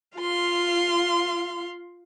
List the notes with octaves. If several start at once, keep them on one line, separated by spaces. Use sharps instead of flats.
F4 F5 C6